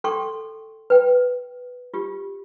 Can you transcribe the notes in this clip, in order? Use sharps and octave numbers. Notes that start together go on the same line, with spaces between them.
A4 G5 C6 C#6
B4 G5
F4 G4